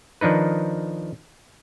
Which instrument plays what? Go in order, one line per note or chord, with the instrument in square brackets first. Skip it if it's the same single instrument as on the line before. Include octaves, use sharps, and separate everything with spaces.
[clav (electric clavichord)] D#3 F3 D4 D#4 B4